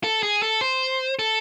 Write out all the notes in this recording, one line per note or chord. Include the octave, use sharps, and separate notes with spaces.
A4
G#4
A4
C5
A4